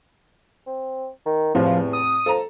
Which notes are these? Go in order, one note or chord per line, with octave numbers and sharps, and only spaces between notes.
C4
D#3
E2 A2 C3 F3
D#6
F3 A4 A#5